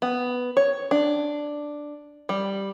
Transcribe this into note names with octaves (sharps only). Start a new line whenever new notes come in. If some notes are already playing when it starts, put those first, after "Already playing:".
B3
C#5
D4
G3